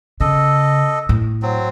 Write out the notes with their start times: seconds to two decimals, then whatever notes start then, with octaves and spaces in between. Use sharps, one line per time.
0.20 C#3 A4 D#5
1.09 A2
1.42 F#3 C4